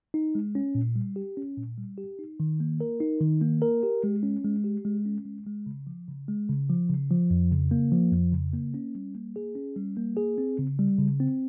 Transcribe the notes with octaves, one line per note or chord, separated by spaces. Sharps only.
D#4
G#3
C#4
A#2
G3
G4
C#4
A#2
G3
G4
D#4
D#3
A#3
A#4
D#4
D#3
A#3
A#4
G4
G#3
C#4
G#3
G4
G#3
C#4
G#3
G#3
C#3
F3
C#3
G#3
C#3
F3
C#3
F3
F2
C#3
A#3
F3
F2
C#3
A#3
C#4
G3
A#3
G#4
C#4
G3
A#3
G#4
C4
C#3
G3
C#3
C4